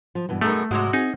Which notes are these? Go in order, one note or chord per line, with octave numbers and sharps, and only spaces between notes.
F3
G2 B2 E3
F#2 B2 A3 D#4 G#4 A#4
G#2 C3 F#3 G#3 F#4
C4 D#4 G#4